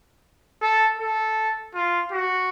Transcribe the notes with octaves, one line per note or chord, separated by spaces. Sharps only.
A4
A4
F4
F#4